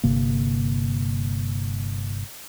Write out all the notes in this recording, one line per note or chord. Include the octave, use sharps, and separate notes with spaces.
G1 C3 A#3